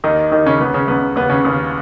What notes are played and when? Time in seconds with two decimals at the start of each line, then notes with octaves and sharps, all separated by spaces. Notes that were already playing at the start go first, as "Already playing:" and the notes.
0.04 D#2 D#3 D#4
0.31 D#2 D#3 D#4
0.46 C#3 C#4
0.60 C#2 C#3 B3
0.74 C#3 C#4
0.87 C#2 C#3 B3
1.16 D#2 C#3 B3
1.30 C#3 C#4
1.45 D#2 C#3